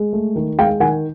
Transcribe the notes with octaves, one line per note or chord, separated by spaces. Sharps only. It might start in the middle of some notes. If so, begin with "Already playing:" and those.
Already playing: G#3
A3
D#3
G#3 F5 G5
D#3 F#5 G#5